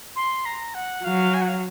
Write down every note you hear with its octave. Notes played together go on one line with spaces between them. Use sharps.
C6
A#5
F#5
F#3 F5
G#5
F#5
F5